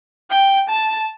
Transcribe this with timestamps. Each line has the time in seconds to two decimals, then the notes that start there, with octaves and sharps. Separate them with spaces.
0.30 G5
0.70 A5